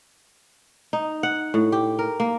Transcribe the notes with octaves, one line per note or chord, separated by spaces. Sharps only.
D#4
F#5
A2
G4
A#4
A#3